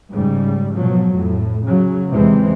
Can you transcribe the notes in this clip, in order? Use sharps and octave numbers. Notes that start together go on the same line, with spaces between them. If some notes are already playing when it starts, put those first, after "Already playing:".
G#2 C#3 G3
B2 F3 F#3
F2 A2
C#3 F#3
E2 C3 E3 G#3 C4